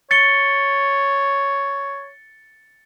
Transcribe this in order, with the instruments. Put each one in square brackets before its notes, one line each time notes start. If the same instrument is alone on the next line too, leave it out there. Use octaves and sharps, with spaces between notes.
[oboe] C#5 [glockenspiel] A6 C#7 G7